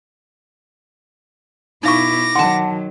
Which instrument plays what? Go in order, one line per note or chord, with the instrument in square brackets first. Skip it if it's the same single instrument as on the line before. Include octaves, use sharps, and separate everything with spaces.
[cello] B2 E4 [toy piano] D#4 F5 C#6 [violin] D6 A#6
[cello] D#3 F#3 [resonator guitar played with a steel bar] F#5 A5 [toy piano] C6